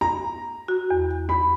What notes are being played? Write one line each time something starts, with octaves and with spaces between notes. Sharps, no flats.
A#5
F#4
E2
B5